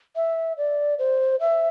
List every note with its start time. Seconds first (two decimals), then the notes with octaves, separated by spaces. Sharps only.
0.16 E5
0.57 D5
0.99 C5
1.40 E5